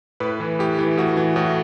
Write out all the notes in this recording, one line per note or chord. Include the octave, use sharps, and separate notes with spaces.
A2 B4
E3
A2 G4
E3
A2 F#4
E3
A2 F#4